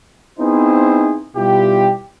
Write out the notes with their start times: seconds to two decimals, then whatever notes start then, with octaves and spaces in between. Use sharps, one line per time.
0.39 B3 C4 D#4 E4 G#4 C5
1.36 B2 G3 E4 F4 G4